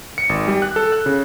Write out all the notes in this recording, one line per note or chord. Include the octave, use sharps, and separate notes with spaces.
C#7
G#1
G3
F#6
A4
F#6
C#3